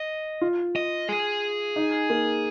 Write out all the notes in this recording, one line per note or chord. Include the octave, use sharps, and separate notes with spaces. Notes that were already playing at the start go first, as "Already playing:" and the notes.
Already playing: D#5
F4
D#5
G#4
D#4
A#3